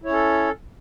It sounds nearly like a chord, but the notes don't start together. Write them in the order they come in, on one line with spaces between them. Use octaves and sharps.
E4 C#5 C#4 A4